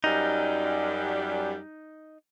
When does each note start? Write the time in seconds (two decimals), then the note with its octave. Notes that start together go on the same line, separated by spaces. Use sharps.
0.04 F#2 G3 D#4